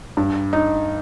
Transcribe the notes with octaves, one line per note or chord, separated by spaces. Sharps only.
G2
D#4